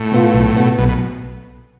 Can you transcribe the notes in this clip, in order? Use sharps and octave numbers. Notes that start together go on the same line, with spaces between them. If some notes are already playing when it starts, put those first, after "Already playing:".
Already playing: A2
B2 B3 F4
B1
B2 B3
B1 B2
B2